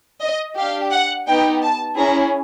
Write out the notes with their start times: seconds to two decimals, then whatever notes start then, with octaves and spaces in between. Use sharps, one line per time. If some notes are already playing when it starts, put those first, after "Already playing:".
0.22 D#5
0.56 D4 G4 F5
0.92 F#5
1.27 B3 D#4 G4 G5
1.62 A5
1.97 C#4 E4 G#4 A#5